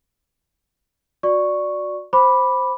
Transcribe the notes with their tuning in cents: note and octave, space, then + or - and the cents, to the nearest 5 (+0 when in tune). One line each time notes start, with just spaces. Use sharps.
F#4 -20 D5 +0 C#6 +0
C5 +5 B5 -5 D6 +0